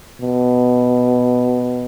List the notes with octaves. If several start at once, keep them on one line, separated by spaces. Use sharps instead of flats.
B2